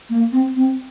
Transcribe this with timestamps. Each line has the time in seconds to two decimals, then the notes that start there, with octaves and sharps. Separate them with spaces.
0.10 A#3
0.32 C4
0.56 C4